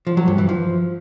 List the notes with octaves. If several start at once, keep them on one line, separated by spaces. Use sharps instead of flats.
F3
F#3
G2
E3
F3